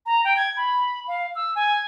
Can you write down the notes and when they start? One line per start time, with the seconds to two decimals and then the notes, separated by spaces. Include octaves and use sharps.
0.06 A#5
0.25 G5
0.37 G#6
0.57 B5
1.08 F5
1.35 E6
1.56 G#5